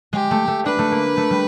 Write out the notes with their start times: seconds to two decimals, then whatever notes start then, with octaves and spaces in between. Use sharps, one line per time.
0.13 G#3 G4
0.31 A3
0.48 A3
0.66 D4 B4
0.79 A3
0.92 A#3
1.17 A3
1.30 G3